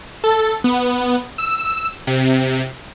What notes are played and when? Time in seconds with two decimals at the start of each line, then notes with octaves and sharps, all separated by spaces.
0.24 A4
0.64 B3
1.38 E6
2.07 C3